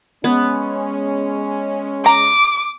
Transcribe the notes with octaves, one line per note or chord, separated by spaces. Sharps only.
G#3 B3 C#4
A#5 D6